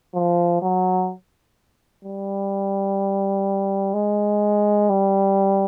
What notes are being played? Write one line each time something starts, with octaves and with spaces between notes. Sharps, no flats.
F3
F#3
G3
G#3
G3